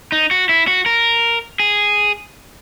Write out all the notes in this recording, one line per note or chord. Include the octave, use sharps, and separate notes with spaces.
D#4
F#4
E4
F#4
A#4
G#4